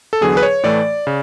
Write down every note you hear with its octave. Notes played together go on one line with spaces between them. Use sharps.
A4
E2 D3 F#3 B3 G#4
B4
C#5
A2 E3 A3 D5
C#3